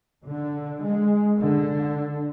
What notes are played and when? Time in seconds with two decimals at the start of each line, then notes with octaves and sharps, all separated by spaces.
0.25 D3
0.83 G#3
1.38 D3